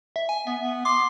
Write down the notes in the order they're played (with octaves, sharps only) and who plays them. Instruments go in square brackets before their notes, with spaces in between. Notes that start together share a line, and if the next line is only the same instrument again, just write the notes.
[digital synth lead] E5
G#5
[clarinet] B3 [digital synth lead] E5
[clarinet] B3
[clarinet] C6 [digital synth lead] D6